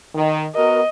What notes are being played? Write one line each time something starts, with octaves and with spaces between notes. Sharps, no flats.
D#3
B3 F#4 A#4 D#5